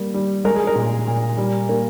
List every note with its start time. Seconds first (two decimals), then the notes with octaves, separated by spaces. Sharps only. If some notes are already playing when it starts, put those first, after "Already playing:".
Already playing: G3 A#3
0.14 G3
0.45 G#3 A#4
0.56 G#4
0.67 A#4
0.75 A#2
1.07 A#2
1.37 G3
1.69 A#3